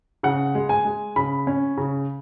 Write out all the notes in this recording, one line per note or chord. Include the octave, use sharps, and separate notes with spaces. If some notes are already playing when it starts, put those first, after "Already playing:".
C#3 F#5
G#3
G#5
G#3
C#3 B5
C#4
C#3